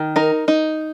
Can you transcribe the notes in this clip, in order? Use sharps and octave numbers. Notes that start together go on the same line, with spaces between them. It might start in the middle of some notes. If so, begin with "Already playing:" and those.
Already playing: D#3
D#4 A#4
D#4